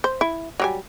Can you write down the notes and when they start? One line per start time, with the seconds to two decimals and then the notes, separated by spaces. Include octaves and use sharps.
0.04 C5
0.21 E4
0.60 F#3 G3 G#5